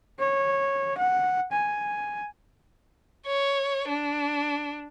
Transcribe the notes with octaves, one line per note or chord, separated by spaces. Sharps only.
C#5
F#5
G#5
C#5
D4